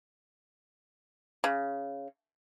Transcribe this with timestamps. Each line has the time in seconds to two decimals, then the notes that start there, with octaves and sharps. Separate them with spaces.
1.44 C#3